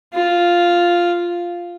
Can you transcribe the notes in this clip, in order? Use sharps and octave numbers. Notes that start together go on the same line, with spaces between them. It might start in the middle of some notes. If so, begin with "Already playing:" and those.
F4